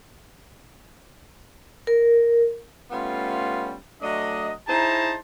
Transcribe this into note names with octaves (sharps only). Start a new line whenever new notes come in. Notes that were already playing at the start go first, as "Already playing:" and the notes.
A#4
G3 A3 B3 C#4 F4
F#3 A3 D4 D#5
D#4 E4 G#4 C5 A5 A#5